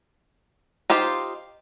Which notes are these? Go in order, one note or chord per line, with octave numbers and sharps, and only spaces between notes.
D#4 F4 G4 C5